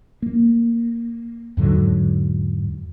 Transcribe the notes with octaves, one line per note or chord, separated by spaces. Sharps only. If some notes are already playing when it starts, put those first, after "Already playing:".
A#3
E2 G#2 D3 F#3